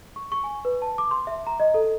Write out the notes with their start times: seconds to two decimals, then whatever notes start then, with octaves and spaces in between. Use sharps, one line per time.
0.16 C#6
0.32 C#6
0.44 G#5
0.65 B4
0.82 A5
0.98 D6
1.11 C6
1.27 E5
1.47 A#5
1.60 D#5
1.74 A4